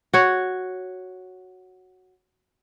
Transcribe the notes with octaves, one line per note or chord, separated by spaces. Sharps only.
F#4 C#5